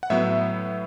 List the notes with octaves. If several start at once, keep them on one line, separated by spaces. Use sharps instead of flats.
F#5
A2 F#3 B3 E5